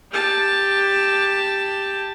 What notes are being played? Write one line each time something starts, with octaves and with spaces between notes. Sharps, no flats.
G4 A5